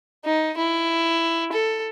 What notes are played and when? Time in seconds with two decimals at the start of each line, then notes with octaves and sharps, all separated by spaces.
0.25 D#4
0.57 E4
1.53 A4